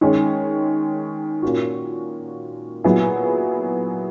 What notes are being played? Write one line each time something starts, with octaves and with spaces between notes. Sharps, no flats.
D#3 G#3 C#4 G#4 C#5
A#2 A#3 C#4 F#4
A#2 F#3 B3 E4 G#4